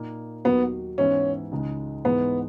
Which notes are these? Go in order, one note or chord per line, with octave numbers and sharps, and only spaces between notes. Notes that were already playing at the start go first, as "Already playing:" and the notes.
Already playing: A#2 A#3 D#4
D#2 D#3 F#3 B3
G#2 E3 B3 C#4 E4
C#2 C#3 G#3 D#4
G#2 E3 G#3 B3 D#4